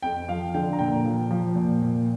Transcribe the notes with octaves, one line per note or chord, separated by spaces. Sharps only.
F2 G5
F3 F5
D3 G5
A#5
A#2 G5
F3
F3
A#2
A#2